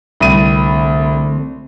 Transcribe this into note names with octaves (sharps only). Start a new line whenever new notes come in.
C2 D3 A3 C4 D#7